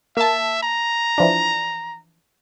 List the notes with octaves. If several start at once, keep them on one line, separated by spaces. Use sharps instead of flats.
A#3 E5 A5
A#5
E3 F3 D4